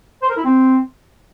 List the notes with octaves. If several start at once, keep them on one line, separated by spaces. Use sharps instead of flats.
C5
A#4
E4
C4